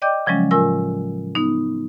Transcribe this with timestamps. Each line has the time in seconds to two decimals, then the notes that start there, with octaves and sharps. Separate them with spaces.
0.02 D5 D#5 G5 D6 G6
0.26 C#3 F3 F#3 G#3 C#4
0.51 A2 F4 A#4 G#5 E6
1.35 B3 D#4